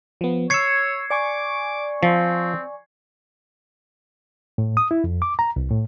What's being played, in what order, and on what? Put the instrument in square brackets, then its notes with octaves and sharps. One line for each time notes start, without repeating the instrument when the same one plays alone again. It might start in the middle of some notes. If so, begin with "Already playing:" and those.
[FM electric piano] F3 B3
[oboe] C#5 [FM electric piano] C#6 E6 [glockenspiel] G#6 C7 C#7
[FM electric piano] D5 G#5 C#6 [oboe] D6
[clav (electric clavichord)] F3 [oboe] C4
[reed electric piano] A2
D#6
E4
F2
D6
A#5
C2
A2